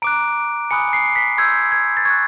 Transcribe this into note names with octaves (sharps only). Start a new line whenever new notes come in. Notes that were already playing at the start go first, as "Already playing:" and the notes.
A#5 D6 F#6 D7
G#5 B5 D#6 F#6 C#7
C7
B6
C6 E6 G6 G#6
G#6
A6
C#6 F#6 G#6